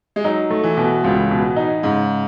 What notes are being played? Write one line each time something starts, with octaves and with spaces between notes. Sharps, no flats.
G#3
F#3 D#4
A3
E3
B2
C#2 A2
B2
D#4
G#2 C#3